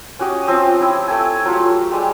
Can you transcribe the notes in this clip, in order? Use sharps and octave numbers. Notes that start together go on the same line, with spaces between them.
C#4 F#4 G4 D#5
F3 C4 D#5
E4 G5 D6 E6
A3 G5 G#5
F#3 A3 F4 G4
G3 G#3 G5